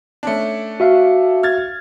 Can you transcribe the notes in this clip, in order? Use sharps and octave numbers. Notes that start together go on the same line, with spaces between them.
A3 C#4 D4
F#4 E5 F5
F6 G#6 A6